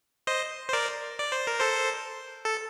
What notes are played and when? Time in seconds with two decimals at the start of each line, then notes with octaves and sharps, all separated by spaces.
0.27 C5 D#5
0.69 C5
0.73 A#4 D5
1.19 D5
1.32 C5
1.47 A#4
1.60 A4 C5
2.45 A4